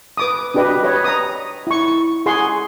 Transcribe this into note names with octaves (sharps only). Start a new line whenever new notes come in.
B4 D6 D#6
D4 F#4 G4 B4 D#5
B4 C#5 D#5 G5
A#5 D#6
E4 C#6
G#4 F#5 C6 C#6